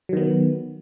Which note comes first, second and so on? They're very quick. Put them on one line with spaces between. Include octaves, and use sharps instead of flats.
F#3 D#3 B3